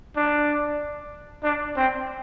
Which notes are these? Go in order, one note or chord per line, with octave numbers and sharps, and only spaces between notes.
D4
D4
C4